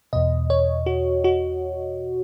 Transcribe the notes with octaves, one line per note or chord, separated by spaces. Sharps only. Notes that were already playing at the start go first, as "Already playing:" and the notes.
E2 B2 D#5
C#5
F#4
F#4